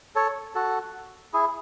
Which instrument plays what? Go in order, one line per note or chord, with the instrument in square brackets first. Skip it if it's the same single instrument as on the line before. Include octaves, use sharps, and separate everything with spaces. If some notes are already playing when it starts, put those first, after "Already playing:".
[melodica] A4 C#5
F#4 A4
E4 G#4